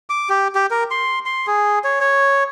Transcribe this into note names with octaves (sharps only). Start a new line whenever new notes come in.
D6
G4
G4
A#4
C6
C6
G#4
C#5
C#5